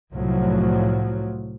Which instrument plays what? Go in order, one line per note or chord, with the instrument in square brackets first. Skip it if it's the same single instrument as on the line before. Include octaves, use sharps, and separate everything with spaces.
[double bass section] C2 A2 F3 F#3